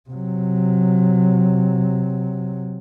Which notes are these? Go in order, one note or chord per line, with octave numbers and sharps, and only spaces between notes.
C3 F#3